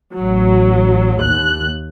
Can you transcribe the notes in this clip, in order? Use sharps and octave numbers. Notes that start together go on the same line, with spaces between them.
A1 F#3
D#2 F#6